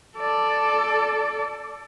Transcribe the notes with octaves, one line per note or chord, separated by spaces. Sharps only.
A4 D5